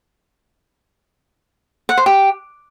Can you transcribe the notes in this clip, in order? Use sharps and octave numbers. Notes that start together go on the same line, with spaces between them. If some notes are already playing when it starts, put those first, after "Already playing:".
F#5
C5
G4